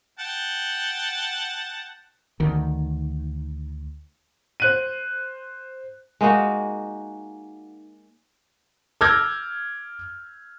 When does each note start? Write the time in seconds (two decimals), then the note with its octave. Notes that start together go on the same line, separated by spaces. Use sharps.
0.20 F#5 G5 A5
2.40 D2 D#3
4.60 C5 F#6 D#7
6.21 G#3 A#3 D#4 F#4
9.01 D6 E6 F6 G6 G#6 A#6